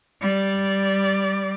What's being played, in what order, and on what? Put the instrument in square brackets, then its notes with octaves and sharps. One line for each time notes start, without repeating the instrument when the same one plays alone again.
[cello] G3 D5